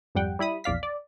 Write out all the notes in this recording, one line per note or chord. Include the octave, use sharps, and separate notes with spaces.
G#1 F2 G3 F#5 G5
G3 E4 B5 D#6
A#1 E2 D5 F5 B6
D5